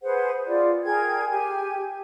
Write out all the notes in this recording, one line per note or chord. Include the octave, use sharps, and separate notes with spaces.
G#4 B4 C5 F#5
F4 G#4 D5
G#4 A#4 G5 G#6
G4 G#5